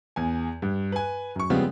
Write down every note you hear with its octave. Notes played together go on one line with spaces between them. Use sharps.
E2 G#5
G2
B4 G#5
F#2 C#6
C#3 F3 G3 G#3 B3 C4